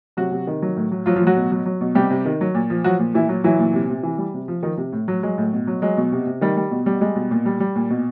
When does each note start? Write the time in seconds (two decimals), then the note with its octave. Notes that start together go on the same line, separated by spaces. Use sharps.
0.17 C3 F#3 F#4
0.31 C3
0.47 D#3
0.62 F#3
0.76 A2
0.91 F#3
1.06 F3 F#3 F4
1.16 F3 F4
1.22 A2
1.27 F#3 F#4
1.37 B2
1.52 F#3
1.66 F#3
1.81 B2
1.95 C3 G3 G4
2.10 C3
2.26 D#3
2.41 F#3
2.55 A#2
2.70 F3
2.84 F3 F#3 F#4
2.99 A#2
3.14 A#2 E3 E4
3.29 F#3
3.44 E3 F#3 E4
3.59 A#2
3.74 C3
3.90 C3
4.03 E3
4.18 G3
4.34 C3
4.48 F3
4.63 D#3 F3 D#4
4.78 C3
4.92 A2
5.08 F#3
5.23 F#3 G#3
5.38 A2
5.53 B2
5.67 F#3
5.82 F#3 G#3
5.97 B2
6.12 C3
6.27 C3
6.41 D#3 G3
6.57 G3
6.71 B2
6.86 G3
7.01 G3 G#3
7.16 B2
7.31 A#2
7.46 G3
7.60 G3
7.76 A#2
7.90 B2